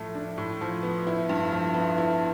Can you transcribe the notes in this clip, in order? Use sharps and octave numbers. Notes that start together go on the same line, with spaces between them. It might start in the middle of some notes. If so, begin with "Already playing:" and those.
Already playing: A2 F3 A3
D4
A2
F3
B3
E4
G2
F3
B3
E4